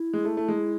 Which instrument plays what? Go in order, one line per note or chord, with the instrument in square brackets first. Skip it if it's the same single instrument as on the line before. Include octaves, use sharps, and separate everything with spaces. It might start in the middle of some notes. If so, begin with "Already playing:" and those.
Already playing: [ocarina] E4
[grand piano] G#3
A3
A3
G#3